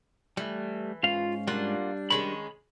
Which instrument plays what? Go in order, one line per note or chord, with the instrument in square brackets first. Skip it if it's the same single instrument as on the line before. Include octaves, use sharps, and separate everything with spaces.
[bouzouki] E3 [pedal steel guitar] G3 A3
[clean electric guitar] G#2 C#4 F5 [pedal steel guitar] F4
[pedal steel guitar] G3 D4 [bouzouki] A#3 F4 F#5
[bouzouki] D#3 G#3 C#4 [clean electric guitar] B5